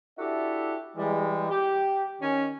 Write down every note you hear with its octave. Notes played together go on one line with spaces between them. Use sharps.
D4 E4 F#4 G4 A4 E5
E3 G3 G#3
G4
D#3 C#4